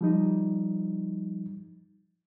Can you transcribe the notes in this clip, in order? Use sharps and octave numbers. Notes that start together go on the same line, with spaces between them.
F3 G3 D#4